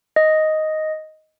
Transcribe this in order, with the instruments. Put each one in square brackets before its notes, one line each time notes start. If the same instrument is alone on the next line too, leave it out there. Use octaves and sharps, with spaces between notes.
[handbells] D#5